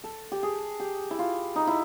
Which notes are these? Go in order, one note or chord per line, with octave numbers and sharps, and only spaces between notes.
A4
G4
G#4
G4
E4
F4
D#4
E4